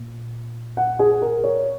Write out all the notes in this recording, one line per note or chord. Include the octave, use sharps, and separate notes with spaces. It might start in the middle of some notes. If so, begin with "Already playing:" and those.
Already playing: A#2
F#5
G#4
A#4
C#5